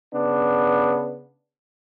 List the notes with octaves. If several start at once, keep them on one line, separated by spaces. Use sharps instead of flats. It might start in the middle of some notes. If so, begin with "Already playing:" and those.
C#3 B3 D4